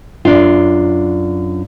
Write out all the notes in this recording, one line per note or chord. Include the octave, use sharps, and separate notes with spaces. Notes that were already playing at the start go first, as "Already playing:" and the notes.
F#2 D4 F4